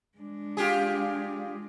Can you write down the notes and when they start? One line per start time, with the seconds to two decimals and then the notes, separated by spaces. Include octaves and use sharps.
0.18 G#3 D4
0.57 F4 G4 G#4